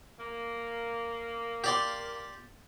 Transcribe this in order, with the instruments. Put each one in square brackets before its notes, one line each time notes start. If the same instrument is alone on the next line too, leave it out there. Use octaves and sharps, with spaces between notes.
[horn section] A#3
[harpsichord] G4 D5 C6